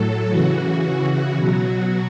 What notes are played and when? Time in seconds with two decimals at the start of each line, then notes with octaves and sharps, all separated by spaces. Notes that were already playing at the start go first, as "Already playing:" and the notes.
Already playing: A2 F#3 A4
0.30 C#3 E3 F#4
0.84 C#3 E3
1.37 B2 F#3 F#4